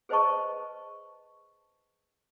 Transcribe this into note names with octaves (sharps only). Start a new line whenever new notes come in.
G#4 B4 C5 D#5 A5 C#6